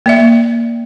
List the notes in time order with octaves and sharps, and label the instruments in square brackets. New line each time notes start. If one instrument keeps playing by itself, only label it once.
[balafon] A#3 D5 E5